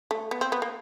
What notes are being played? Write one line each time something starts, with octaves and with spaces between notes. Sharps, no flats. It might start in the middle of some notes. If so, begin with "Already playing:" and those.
A3
B3
C4
B3
A#3